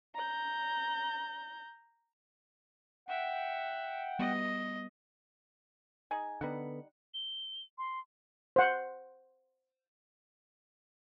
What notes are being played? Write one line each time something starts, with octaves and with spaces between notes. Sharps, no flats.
A#5 G6
E5 F#5 G5
G3 B3 D#5
D#4 G#4 G#5
D3 G3 B3 D#4 F#5
G7
C6
C5 F#5